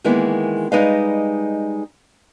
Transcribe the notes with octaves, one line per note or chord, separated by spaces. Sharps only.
D#3 E3 G#3 A#3 B3 E4
G3 G#3 D#4 B4 D#5 F5